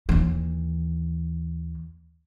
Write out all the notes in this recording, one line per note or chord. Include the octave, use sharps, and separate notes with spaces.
D#2 E3